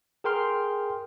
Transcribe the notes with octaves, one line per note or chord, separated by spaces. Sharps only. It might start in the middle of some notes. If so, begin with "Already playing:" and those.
G#4 A#4 G5 C6 F6